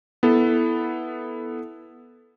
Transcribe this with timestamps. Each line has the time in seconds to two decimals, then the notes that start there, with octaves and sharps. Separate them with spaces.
0.23 B3 E4 A4